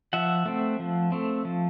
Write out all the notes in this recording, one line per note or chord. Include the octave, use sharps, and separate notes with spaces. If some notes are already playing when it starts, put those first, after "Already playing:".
F3 E5 F#5
A3 C4
F3
A3 C4
F3